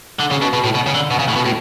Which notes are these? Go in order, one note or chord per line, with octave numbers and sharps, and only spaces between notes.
D3
C#3
B2
B2
A2
B2
C#3
D3
B2
C#3
A2
B2
A2